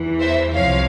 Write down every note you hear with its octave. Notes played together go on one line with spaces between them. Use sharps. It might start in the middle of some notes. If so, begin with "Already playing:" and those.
Already playing: E2 E3
C5 E5
C2 C3 F3 C#5 F5